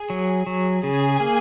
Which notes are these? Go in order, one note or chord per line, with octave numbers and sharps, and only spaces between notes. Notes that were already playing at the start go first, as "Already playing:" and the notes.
Already playing: G#4
F#3
F#3
C#3 G#4
A#3